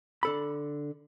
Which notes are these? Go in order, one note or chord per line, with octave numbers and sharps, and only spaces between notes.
D3 A4 B5